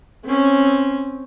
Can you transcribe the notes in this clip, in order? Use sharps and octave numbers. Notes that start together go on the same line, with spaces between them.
C4 C#4